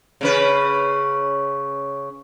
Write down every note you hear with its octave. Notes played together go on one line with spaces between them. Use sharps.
C#3 C#4 B4